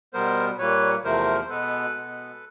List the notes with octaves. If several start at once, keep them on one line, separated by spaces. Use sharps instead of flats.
B2 G3 B3 A#4 C5
A#2 G3 A#3 B4 C#5
E2 C3 F3 A3 A#4 C5
C5
B2 G#3 B3 A4 B4
B2 G#3 B3